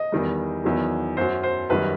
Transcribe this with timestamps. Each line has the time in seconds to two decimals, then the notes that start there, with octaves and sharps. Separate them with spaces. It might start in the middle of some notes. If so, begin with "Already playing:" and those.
Already playing: D#5
0.12 E2 D#3 G3
0.64 E2 D#3 F#3
1.17 F#2 F#3 C5
1.43 C5
1.70 F#2 D#3 G3 B4